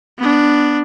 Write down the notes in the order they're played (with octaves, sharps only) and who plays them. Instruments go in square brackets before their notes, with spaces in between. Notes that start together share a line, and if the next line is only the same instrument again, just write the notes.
[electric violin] B3 D4